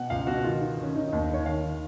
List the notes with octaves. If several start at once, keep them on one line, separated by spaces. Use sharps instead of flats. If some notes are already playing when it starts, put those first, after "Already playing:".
Already playing: B2 F#5
C#2 F5
B2 F#4
D#3 F4
D#3
D#3 C#4
D#3 D#4
D#4
D#2
D#4
D#3 C#5
D#3 F5
D#3